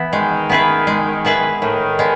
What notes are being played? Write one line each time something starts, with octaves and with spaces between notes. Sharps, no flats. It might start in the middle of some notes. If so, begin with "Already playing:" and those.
Already playing: E3 B3 E4
D#3 G#3
B3 E4 G#4 B4
G#3
B3 E4 G#4 B4
A2 D#3
G#3 B3